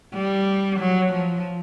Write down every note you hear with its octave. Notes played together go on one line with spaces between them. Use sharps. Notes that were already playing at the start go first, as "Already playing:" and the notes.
G3
F#3
F3